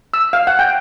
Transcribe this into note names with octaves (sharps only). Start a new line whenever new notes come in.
E6
F5
F#5
G5